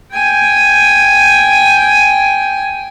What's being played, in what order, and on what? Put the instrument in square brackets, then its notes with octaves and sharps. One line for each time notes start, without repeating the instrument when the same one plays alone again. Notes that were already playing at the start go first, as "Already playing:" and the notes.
[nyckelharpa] G5 G#5